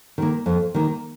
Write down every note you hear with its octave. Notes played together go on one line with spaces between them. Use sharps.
D#3 A#3
F2
D#3 A#3